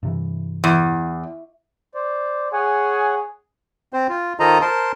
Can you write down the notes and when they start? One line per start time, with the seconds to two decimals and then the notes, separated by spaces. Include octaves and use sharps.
0.03 G2 C3 E3
0.64 E2
1.95 C5 D5
2.53 G#4 C#5 F#5 G#5
3.93 C4 C5
4.09 F4
4.40 D#3 F4 A4 C5 D#5 A#5
4.61 A#4 C5 A5 C6